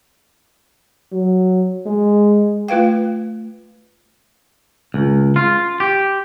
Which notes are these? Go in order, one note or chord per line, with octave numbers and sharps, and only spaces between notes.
F#3
G#3
A3 F4 B4 F5 G5
C#2
F4
G4